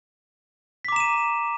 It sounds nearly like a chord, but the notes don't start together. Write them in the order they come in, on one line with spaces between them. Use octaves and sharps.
B6 D6 A#5 E7 D#7